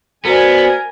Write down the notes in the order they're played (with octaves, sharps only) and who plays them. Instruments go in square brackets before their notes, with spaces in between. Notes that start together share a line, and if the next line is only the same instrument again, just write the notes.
[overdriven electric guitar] B3 [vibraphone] F#4 C5 D5 [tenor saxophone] A#4 [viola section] G#5